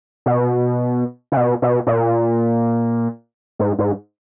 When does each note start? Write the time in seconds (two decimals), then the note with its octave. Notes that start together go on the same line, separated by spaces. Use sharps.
0.26 B2
1.32 C#3
1.37 B2
1.62 B2
1.87 A#2
3.59 G#2
3.79 G#2